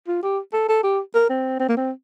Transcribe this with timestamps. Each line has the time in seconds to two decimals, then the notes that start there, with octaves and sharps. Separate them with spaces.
0.08 F4
0.23 G4
0.54 A4
0.69 A4
0.84 G4
1.15 A#4
1.30 C4
1.60 C4
1.69 A#3
1.77 C4